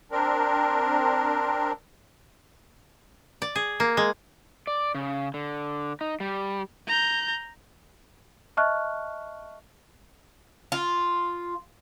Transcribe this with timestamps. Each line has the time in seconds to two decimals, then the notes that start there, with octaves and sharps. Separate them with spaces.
0.12 C4 D4 A#4
3.42 D5
3.56 G#4
3.80 A#3
3.97 G#3
4.67 D5
4.95 C#3
5.34 D3
6.01 D#4
6.20 G3
6.87 A#5 G6
8.57 D#5 E5 A5 C#6 F6 F#6
10.72 F4